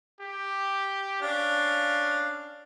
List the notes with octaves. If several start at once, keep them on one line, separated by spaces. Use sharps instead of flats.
G4
C#4 D4 F5